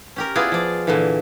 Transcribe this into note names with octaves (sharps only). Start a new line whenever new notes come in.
C#4 G4 A#4
B3 E4 F4 G#4 D5
F3 D5
A#2 D3 E3